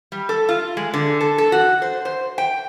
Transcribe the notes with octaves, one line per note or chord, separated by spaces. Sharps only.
G3
A4
F4
G#3
D3
A4
A4
F#4
C5
C5
G5